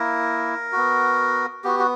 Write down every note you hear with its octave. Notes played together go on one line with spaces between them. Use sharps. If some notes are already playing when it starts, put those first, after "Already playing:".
Already playing: A#3 E4 A#4
B3 F#4
B3 F#4 G4
F#4